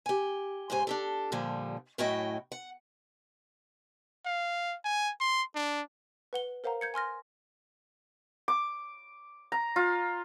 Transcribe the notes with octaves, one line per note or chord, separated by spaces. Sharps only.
G4 G#5
G#2 C#3 C5 G#5
D4 G4 A4
A#2 D3 F3 G3
F#2 A2 E4 F#4 D#5 G5
F#5
F5
G#5
C6
D4
B4 F#5 G7
A#4 C5 F5 F#5 A#5
G6 G#6 C#7
G#5 C6 F6 A#6
D6
A#5
F4